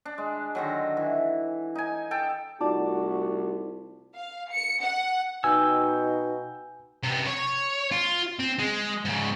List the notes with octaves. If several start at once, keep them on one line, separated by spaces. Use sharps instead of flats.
D4
G#3
D3 D#3 F#3
E3
D#4 G#5
A4 G5
C2 A3 D#4 F4 F#4 D5 A5 D6
F5
C#7
F#5
B2 D#4 G5 G#5 E6
C3 B3
C#5
F4
C4
G#3
G#2 C#3